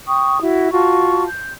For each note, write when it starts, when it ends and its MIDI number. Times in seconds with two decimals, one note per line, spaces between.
0.08 0.40 79
0.08 0.40 85
0.08 0.40 87
0.41 0.69 64
0.41 0.69 66
0.72 1.25 65
0.72 1.25 66
0.72 1.25 81
0.72 1.25 85
1.26 1.53 91